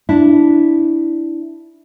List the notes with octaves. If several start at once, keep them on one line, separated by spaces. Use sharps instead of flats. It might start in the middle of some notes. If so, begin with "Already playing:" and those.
D4 E4